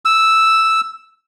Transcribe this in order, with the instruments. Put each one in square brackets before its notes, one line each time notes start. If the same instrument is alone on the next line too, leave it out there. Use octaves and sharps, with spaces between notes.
[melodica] E6